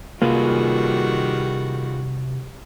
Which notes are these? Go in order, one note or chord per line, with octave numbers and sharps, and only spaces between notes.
C3 D#3 G3 A#3 F4 F#4 G#4 B4